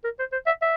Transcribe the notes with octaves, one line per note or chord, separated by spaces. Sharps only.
A#4
C5
C5
E5
E5